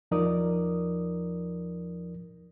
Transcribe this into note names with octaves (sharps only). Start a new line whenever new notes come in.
E2 F3 D#4 A#4 D5 D#6